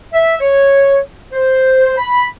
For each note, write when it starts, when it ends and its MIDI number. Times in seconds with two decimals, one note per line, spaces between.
0.13 0.36 76
0.40 0.99 73
1.33 1.96 72
1.98 2.25 83